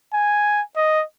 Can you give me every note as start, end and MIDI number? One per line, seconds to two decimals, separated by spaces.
0.13 0.61 80
0.76 1.03 75